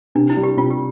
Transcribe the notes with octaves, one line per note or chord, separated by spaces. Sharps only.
C3 D4
E4
G3
G4
C3 F4
G4